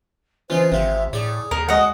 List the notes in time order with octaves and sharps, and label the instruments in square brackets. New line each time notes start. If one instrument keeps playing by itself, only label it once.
[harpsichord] E3 C#4 D#4 [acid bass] F4 [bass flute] C5
[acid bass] G#1 [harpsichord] C3 F4 [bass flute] E5
[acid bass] A2 [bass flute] G#4 [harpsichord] C#5 D5
[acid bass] D#2 [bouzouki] A#4
[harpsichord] G#3 [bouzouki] F#4 D#5